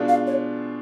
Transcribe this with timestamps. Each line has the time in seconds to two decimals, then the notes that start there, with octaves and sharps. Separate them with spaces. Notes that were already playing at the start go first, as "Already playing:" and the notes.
Already playing: B2 G#3 D4 F4
0.09 F5
0.27 C#5